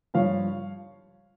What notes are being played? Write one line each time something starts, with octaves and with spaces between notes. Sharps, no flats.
G2 F3 C#5 F5